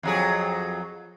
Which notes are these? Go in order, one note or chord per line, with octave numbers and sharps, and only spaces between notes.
F2 F#3 G#4